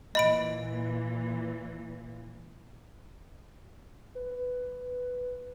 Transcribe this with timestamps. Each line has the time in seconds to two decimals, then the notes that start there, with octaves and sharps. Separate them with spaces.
0.15 A#2 E3 D#5 B5 D7
4.15 B4